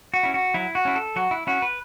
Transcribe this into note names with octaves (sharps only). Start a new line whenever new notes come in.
F#4
C#4 E4
F#4
F#3 E4
F#4
C#4 E4
A4
F#3 F#4
E4
C#4 E4 F#4
B4